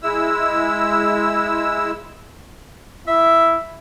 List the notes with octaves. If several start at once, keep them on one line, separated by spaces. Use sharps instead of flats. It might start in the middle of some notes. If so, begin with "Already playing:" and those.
G#3 E4 E6
E4 E5